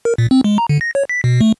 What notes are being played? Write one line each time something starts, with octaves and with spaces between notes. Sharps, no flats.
A#4
A#2
C4
G#3
A#5
D3
A#6
C#5
B6
B2
A3